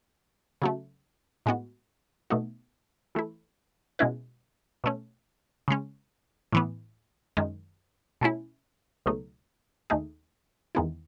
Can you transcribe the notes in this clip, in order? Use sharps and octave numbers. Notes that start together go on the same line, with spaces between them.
C#3 F#3 A3
A2 G#3 B3 F#4
B2 A3 D#4 F#4
E3 A3 E4
B2 G#3 C#4 E4 B4
B2 A3 C#4
C#3 G#3 C#4
A2 E3 B3
F#2 D#3 G#3
B2 A3 C#4 E4
C#2 B2 F#3 A3 D#4
D#2 D#3 A3 D#4 G#4
E2 D#3 G#3 B3 E4